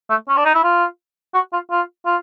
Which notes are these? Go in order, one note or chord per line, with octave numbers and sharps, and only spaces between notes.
A3
C#4
D4
D#4
E4
F4
F#4
F4
F4
F4